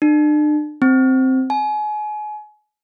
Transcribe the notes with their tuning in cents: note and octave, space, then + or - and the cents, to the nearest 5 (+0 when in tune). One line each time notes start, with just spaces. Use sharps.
D4 +40
C4 +0
G#5 +30